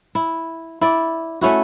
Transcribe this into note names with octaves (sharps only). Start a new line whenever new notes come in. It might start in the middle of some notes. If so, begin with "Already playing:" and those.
E4
E4 D5
A3 C#4 E4 F#4